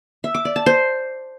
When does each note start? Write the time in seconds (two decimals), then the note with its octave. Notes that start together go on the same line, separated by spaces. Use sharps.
0.24 E5
0.35 D6
0.45 D5
0.56 A5
0.66 C5